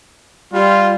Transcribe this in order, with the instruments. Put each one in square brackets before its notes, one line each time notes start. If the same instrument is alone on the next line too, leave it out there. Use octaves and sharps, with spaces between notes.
[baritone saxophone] G3 [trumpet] F4